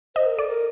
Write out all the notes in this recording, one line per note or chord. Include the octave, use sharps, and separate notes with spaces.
C5 D#5
A#4
A4 D5
A#4